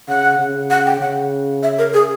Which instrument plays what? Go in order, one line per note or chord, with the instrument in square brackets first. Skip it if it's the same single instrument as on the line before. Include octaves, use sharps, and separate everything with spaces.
[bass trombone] C#3 [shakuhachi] F#5
[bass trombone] C#3
[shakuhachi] F#5
G5
[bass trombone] C#3 [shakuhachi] F#5
[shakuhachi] E5
A#4
G#4